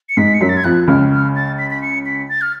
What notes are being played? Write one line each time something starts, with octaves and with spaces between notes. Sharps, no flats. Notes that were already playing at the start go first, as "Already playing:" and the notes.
C#7
G#2 G#3 B6
C#7
F#2 F#3 B6
A6
G#6
F2 F3 F#6
C#2 C#3 F6
F6
A6
B6
B6
C#7
B6
A6
F6